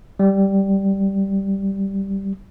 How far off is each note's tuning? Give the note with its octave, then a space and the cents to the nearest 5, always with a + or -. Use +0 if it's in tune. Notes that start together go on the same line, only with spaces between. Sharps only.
G3 -5